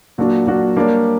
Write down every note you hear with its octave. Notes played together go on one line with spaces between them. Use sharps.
A#2 F#3 A#3 D4 F#4
A#2 F#3 A#3 D4 F#4
G3 A#3 D4 A#4 C#5